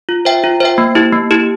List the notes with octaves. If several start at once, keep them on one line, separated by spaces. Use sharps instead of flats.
F4
C5 E5 G5
F4
C5 E5 G5
A#3
E4 G4
A#3
E4 G4